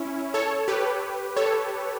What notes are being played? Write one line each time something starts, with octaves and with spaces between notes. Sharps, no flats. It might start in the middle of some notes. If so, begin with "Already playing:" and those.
Already playing: C#4 E4
A4 C#5
G4 B4
A4 C#5